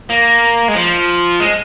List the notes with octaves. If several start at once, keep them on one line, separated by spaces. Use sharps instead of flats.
A#3
G#3
F3
G#3